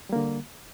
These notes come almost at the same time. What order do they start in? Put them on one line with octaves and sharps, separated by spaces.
G3 A#3 D3